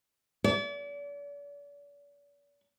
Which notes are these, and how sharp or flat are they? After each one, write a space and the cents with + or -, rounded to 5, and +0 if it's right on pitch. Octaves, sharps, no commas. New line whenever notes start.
D5 -40